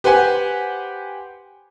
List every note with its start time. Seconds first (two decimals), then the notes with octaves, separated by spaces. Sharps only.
0.04 G4 B4 C5 F#5 G#5